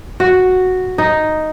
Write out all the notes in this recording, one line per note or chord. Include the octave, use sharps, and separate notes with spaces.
F#4
D#4